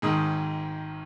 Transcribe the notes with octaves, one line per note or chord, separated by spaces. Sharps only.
G#1 G#2 D#3 G#3 D#6